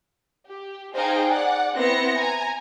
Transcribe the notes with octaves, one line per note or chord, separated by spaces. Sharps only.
G4
D#4 G#4 C5 D#5 F5 G5
D5 F#5
B3 C4 E4 A#6 C#7
G#5 A#5